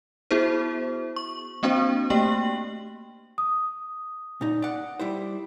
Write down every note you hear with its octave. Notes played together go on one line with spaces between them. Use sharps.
B3 E4 F#4 G#4 C5
C#6
A#3 C4 D4 F#4 C5
A3 A#3 G4 G5 F#7
D#6
A#2 D#4
D5 F#5
G3 E4 C5